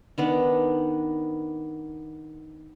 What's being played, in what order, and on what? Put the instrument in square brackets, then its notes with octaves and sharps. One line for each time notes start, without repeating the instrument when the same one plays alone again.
[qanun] D#3 B3 D4